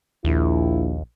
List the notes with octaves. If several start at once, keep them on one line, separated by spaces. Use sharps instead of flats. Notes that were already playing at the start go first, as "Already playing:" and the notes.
A#1 D#2 E4